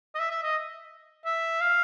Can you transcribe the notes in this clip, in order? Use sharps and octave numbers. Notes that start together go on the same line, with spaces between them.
D#5
E5
E5
D#5
E5
F5